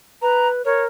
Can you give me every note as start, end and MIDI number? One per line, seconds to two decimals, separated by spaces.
0.22 0.62 71
0.22 0.48 82
0.65 0.87 70
0.65 0.83 73